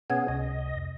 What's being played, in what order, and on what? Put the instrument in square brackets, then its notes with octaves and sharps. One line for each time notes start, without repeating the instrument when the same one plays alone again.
[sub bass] B2 [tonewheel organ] B3 C#4 G#4 [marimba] F#5 G#5 G#6
[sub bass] C#2 [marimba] C3 [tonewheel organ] D#5
[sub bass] F2